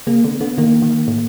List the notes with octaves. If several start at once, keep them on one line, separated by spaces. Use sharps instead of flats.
C#3 A#3
D3 B3
D3 B3
D#3 A#3
D#3
A2